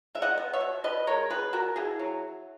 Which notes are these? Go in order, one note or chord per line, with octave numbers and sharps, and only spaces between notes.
G#3 E5
D#5 F#5
B3
C#5 E5
B2
B2 B4 D#5
G#3 A#4 C#5
B3 G#4 B4
B2 F#4 A#4
B2 E4 G#4
F#3